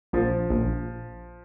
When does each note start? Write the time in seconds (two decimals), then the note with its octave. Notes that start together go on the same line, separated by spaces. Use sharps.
0.13 A#1 F3
0.50 A#1